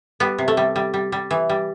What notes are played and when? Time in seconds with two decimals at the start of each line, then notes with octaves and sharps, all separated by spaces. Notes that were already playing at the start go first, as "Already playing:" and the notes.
0.20 G3 B3
0.38 C3
0.48 A3
0.57 G3
0.76 G3
0.94 G3
1.12 G3
1.31 E3
1.49 G3